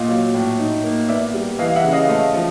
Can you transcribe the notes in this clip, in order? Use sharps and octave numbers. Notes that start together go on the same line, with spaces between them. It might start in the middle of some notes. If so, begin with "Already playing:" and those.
Already playing: A#2 D#5 F5
F#3
A2
D#4
A#3
B3 D5 E5
G3
E3 D#5 F5
E5 F#5
C#3
D#5 F5
A3 D#5 F5
F3